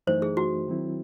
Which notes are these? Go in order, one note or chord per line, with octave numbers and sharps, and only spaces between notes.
F#2 E3 A3 D#4 C5
G#4
F#4
D#3 F#3 C4 E4